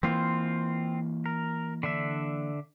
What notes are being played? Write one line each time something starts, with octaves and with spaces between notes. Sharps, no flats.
E3 A#3 C4 F4
A#4
D3 D4 E5